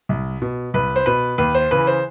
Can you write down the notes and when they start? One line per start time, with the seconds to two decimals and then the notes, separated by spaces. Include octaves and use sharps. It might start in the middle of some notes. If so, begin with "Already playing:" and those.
0.09 C2
0.42 B2
0.74 C2 B4
0.96 C5
1.06 B2 B4
1.38 D#2 B4
1.55 C5
1.71 C#3 E3 B4
1.87 C5